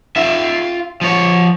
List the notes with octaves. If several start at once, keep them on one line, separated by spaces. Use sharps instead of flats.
F4 E5
F3 C#5